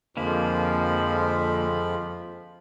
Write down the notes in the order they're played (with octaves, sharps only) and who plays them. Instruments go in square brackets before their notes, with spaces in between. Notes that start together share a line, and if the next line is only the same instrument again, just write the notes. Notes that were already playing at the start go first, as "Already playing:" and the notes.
[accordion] F2 [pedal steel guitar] D3 A#3 [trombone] F3 [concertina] G#3 B5